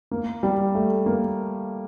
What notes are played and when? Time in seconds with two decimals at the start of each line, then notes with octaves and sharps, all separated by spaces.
0.11 A#3
0.43 G3
0.75 A3
1.06 A#3